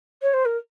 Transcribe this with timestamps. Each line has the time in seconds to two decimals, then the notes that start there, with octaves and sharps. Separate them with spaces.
0.22 C#5
0.33 C5
0.45 A#4